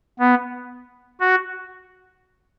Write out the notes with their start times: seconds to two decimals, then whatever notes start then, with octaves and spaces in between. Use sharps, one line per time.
0.19 B3
1.20 F#4